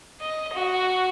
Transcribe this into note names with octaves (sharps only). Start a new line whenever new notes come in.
D#5
F#4